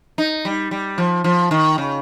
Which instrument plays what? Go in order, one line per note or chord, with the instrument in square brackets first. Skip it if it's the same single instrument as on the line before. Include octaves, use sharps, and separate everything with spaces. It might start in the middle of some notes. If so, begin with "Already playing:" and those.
[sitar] D#4
G3
G3
F3
F3
D#3
C#3